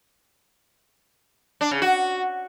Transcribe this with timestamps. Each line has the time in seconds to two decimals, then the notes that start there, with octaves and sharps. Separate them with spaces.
1.61 D4
1.71 C#3
1.82 F#4